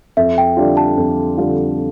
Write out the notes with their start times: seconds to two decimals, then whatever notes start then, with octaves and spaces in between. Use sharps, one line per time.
0.17 F2 E5
0.38 G5
0.57 D3 G3 D4 F4
0.77 A5
0.97 F2
1.37 D3 G3 D4 F4